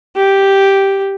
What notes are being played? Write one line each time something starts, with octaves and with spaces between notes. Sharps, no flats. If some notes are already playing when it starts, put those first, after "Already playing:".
G4